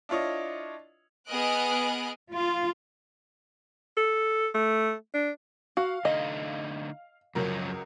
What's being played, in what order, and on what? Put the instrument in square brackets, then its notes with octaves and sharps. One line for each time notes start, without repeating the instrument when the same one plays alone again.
[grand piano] D4 E4 F4 C#5 D#5
[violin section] B3 G#4 D#5 F6 F#6 D7
[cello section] F4
[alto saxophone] A4
A3
D4
[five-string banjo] F#4 [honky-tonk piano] F5
[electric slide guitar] D3 A3 D#4 [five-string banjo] D#5
[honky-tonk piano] C#2 F#3 A#4 [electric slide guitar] F#2 F3 C#4